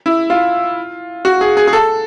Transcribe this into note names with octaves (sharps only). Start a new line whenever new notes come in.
E4
F4
F#4
G#4
G#4
G#4
A4